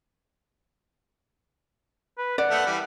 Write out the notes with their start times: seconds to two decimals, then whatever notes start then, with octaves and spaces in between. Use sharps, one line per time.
2.18 B4
2.38 D5 F#5
2.51 A3 B3
2.67 E3 G3